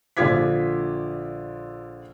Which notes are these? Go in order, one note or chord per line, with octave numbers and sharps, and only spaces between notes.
A#1 D3 F4 D6 G#6 B6